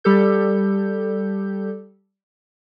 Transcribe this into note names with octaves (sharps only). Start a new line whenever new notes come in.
G3 G4 A4 G6